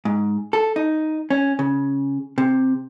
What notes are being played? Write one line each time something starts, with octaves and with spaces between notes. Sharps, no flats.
G#2
A4
D#4
C#4
C#3
C3